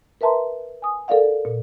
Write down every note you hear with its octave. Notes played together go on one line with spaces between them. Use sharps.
A#4 B4 E5 A5 A#5 C6
G#5 D#6
A4 A#4 D5 F5 F#5
A#2